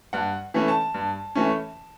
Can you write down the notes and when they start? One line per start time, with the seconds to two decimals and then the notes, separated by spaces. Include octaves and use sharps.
0.13 G2 F#5
0.54 E3 A3 C#4
0.68 A5
0.94 G2
1.35 E3 A3 C#4